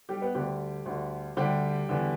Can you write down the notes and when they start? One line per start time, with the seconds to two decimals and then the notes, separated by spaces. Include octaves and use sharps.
0.09 G3 G4
0.21 B3 B4
0.35 D2 D3 G3 G4
0.86 D2 D3
1.37 D2 D3 G3 G4
1.89 E2 D3